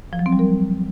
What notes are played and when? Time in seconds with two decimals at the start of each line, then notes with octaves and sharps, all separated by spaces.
0.13 F3
0.19 F#3
0.26 C4
0.32 G3
0.39 A#4